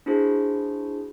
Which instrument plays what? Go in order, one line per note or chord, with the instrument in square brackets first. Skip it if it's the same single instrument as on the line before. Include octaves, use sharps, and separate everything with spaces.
[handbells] D4 E4 F#4 G#4 C5